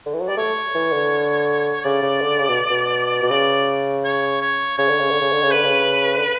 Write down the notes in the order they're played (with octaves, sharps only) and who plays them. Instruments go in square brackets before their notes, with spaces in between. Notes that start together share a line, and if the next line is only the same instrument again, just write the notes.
[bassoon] D3
E3
F#3
[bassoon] G3 [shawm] D5
[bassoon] A3 [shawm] C#5
[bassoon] E3
D3
[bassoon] C#3 [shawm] D5
[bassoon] C#3
D3
C#3
B2
B2
B2
[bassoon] C#3 [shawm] D5
[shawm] C#5
C#5
[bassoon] C#3 [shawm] C#5
[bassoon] D3
C#3
D3
C#3
D3
C#3
[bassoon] D3 [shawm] B4
[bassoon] C#3
D3